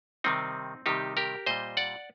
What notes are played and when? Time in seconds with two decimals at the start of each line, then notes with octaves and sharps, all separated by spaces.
0.24 C3 D#3 G3 C4 D#4
0.86 C3 D#3 G3 D#4 G4
1.17 G4 A#4
1.46 A#2 G3 C5 D#5
1.77 D5 F#5